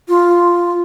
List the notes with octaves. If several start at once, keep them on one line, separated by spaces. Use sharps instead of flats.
F4